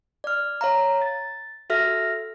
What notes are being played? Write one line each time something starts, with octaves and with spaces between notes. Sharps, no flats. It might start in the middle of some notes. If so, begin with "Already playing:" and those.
D5 F6
C#5 F5 A#5
A6
F#4 A4 E5 F6 A#6